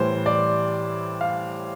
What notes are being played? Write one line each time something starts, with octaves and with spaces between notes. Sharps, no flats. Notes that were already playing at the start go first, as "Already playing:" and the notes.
Already playing: A2 E3 G3 C5
D5
F5